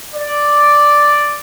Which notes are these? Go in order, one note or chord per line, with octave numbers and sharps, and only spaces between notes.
D5